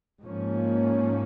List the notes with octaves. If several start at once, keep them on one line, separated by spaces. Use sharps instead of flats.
G#2 F3 A#3 C#4